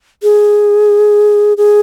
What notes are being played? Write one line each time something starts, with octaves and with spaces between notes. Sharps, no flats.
G#4
G#4